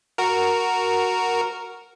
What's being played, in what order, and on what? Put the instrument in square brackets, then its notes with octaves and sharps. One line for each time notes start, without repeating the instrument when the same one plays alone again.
[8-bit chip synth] F#4 A#4